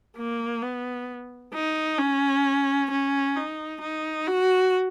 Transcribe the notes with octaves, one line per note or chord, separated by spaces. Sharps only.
A#3
B3
D#4
C#4
C#4
D#4
D#4
F#4